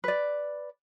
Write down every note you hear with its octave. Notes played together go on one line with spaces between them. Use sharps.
B4 D5